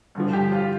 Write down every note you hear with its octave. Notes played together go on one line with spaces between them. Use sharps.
G2 D3 F3
G4
F4